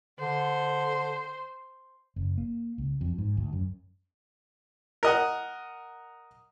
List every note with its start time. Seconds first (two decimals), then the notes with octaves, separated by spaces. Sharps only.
0.20 D3 C5
2.16 F#1
2.38 A#3
2.78 C#2
3.01 F2
3.18 G#2
3.37 D2
3.53 F#2
5.03 A#4 D#5 F#5